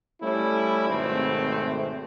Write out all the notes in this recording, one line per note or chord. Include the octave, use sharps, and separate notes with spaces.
G3 A3 C#4 E4
G#1 B2 A3 C4